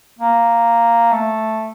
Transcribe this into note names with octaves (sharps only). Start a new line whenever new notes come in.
A#3
A3